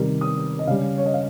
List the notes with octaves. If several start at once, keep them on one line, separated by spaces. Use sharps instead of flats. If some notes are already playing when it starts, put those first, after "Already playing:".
Already playing: C3 D#3 G3
D#6
D#5
C#3 G3 F5
C#5
D#5
F5